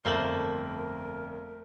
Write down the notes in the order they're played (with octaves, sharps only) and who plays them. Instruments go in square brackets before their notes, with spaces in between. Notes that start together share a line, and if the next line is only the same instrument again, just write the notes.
[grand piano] G1 F2 F#7 [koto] A3 A#3 C5 [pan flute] A#4